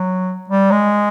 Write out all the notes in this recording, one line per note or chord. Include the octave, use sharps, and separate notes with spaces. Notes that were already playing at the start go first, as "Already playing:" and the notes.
Already playing: F#3
G3
G#3